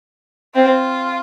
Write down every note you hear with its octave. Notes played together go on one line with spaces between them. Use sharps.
C4 F4